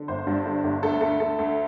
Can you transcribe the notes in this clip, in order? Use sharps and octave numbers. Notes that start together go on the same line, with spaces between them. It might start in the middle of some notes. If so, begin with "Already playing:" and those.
Already playing: D3
G1 C5
G2
D3
G1
D2 A4
D2 A4
D2 A4
D2